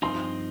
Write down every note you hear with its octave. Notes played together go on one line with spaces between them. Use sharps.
G2 F3 C4 D#4 C6